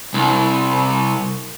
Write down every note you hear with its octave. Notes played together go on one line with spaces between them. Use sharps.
C2